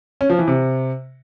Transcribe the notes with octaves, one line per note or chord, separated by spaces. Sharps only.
C#4
F3
E3
C3